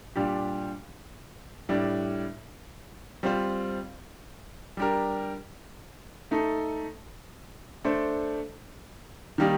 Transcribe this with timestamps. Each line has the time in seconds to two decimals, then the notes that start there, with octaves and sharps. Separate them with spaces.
0.16 A#2 G3 D4 G4
1.69 A2 G3 D4
3.23 G3 C4 F4 C5
4.77 G3 D4 G4 A#4
6.31 A3 D#4 A4
7.84 A3 D4 A4 C5
9.38 D#3 G3 A#3 D#4 G4